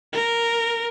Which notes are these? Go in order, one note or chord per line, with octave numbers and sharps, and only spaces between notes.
A#4